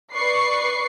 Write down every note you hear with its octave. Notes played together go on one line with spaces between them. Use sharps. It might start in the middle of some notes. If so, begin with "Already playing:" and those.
B4 D5 C#6 C7